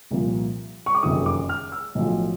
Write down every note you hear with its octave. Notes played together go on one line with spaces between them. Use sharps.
C2 A#2 F3
C#6
D6
F#1 F2 C3 D#3 D#6
D6
F6
E6
B1 A2 F3